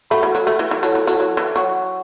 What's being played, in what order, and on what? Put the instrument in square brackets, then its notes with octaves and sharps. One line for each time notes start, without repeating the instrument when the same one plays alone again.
[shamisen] A3 [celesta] F#4 A4 F#5 B5
[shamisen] E3
F#3
A3
E3
E3
[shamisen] F#3 [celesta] E4 A4 C#5 A5
[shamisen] F#3
F#3
F#3
E3
[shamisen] F#3 [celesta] C#5 F#5 C#6